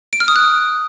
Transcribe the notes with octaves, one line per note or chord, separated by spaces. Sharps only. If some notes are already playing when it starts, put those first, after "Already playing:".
D7
F6
D#6
F#6